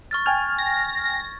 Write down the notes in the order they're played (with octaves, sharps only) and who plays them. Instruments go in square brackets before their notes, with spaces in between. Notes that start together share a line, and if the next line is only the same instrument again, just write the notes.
[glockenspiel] C#6 F6 A6
[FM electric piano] G5 G#5 F6 [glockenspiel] G#6
[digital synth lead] A#6